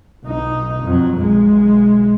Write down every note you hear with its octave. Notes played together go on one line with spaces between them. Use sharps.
B1 D#4
F2 F#3
B1 G#3